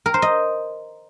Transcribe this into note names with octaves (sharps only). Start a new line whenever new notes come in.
A#4
C5
D#5